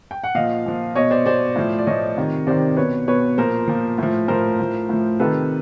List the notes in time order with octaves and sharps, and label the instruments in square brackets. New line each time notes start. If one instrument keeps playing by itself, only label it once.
[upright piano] G5
F#5
A#2 F3 D#5 F5
A#2 F3
B2 C#5 D#5
C5 D5
B2 C5 D5
A2 F3
D5
A2 F3 C#5 D#5
C3 D#3
C3 D#3 C5 D5
B2 B4 C#5
B2 B4 C#5
A#2 F3 A#4 C5
A#2 F3
A2 F3
A2 F3 A#4 C5
A2 F3
A2 F3
C3 D#3 A4 B4